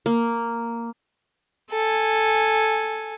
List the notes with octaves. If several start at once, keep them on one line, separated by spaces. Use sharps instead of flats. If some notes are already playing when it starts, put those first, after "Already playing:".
A#3
A4 G#5